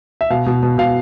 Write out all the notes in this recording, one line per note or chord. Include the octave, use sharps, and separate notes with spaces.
E5
B2 F5
B2
B2
B2 F5